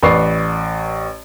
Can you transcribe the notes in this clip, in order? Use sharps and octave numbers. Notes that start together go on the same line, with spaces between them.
A1 B4 D5 C#6 C7